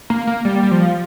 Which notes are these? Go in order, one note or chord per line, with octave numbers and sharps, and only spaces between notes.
A#3
A#3
G3
G3
F3